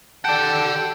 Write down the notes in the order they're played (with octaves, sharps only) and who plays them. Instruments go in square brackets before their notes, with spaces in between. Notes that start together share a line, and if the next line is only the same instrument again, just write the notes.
[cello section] D#3 G4 A4 [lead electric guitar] D5 F#5 [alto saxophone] G5 [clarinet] A5